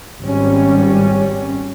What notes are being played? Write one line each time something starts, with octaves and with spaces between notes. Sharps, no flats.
G#1 G3 C#4